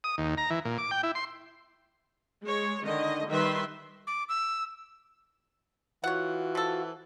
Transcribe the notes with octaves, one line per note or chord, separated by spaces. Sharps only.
D#6
D#2
A#5
E3
A#2
D6
G5
E4
C6
G#3 C#5
D3 D#3 D#5
D#3 G3 B4 E5 C6
D6
E6
E3 F4 F#4 C#5 F#5
F3 A4